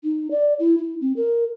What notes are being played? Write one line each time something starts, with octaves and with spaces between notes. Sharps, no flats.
D#4
D5
E4
E4
C4
A#4